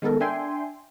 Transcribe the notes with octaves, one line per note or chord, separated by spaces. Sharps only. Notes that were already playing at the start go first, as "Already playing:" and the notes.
D#3 G#3 B3 A4 A#4
D4 E5 G5 G#5 C6